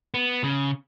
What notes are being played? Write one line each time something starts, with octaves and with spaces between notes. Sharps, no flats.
B3
C#3